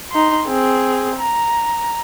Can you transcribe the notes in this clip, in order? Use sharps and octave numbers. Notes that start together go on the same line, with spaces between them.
D#4 C6
C4 G#4
A#5